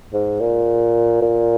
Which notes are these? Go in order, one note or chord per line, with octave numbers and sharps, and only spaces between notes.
G#2
A#2
A#2